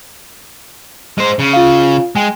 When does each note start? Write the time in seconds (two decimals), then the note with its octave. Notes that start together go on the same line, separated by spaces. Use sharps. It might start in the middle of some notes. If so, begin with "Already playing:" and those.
1.18 G#3 C5
1.39 C#3
1.53 F4 F5
2.16 G#3 G5 G#5